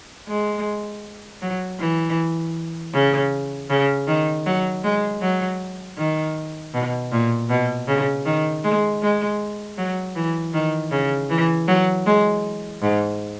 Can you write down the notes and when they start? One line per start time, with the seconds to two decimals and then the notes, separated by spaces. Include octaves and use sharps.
0.28 G#3
1.41 F#3
1.79 E3
2.94 C#3
3.70 C#3
4.07 D#3
4.46 F#3
4.84 G#3
5.21 F#3
5.97 D#3
6.74 B2
7.12 A#2
7.50 B2
7.88 C#3
8.25 D#3
8.64 G#3
9.02 G#3
9.78 F#3
10.15 E3
10.54 D#3
10.91 C#3
11.30 E3
11.68 F#3
12.06 G#3
12.82 G#2